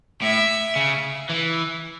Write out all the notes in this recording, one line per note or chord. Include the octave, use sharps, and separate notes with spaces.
A2 E5
C#3
E3